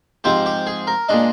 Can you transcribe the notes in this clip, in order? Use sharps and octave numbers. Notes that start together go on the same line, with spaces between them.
G#2 F3 C4 G4
G4
G#4
A#4
A#2 G#3 D4 D#5